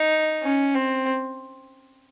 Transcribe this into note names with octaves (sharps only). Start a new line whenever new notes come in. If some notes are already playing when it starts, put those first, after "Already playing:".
Already playing: D#4
C#4
C4